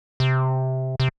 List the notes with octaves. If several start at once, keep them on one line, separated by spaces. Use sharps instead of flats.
C3
C3